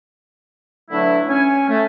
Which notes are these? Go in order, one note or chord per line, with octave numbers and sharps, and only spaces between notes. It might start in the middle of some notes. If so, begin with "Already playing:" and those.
D3 E3 F#3 A3 D4 E4
C#4 G#5
A3